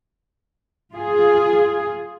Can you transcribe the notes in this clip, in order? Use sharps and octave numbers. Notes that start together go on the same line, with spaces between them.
F4 G#4